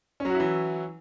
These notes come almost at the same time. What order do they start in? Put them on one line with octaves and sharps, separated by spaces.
C#4 F#3 F#4 E4 E3